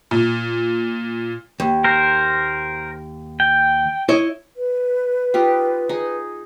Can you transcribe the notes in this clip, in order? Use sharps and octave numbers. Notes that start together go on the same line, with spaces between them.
A#2
D#2
A#4 C5
G5
E4 C#5 D#5
B4
D#4 F4 G4
D#4 G#4